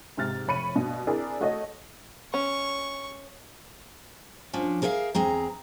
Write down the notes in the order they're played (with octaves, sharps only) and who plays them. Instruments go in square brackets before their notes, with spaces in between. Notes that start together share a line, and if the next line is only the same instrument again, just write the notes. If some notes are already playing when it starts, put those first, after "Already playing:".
[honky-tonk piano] G#2 C3 F6 A6
F1 C#5 B5 C#7 D#7
G2 B2
C4 D4 E4 G#4 A#4
A3 F#4 A4 C#5 D#5
[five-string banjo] C#4 [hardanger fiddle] C#6
[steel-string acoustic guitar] F3 C#4 D4
G#4 A#4 C#5 E5 F5
E2 C4 G#4 A#5